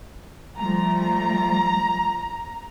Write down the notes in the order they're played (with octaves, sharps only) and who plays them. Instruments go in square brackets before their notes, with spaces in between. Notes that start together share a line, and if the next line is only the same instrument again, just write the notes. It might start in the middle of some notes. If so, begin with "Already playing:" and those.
[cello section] F3 G3 A3 [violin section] A#5